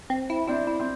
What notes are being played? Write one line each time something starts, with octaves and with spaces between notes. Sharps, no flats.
C4
E4
C4 D4 E4
E4
C4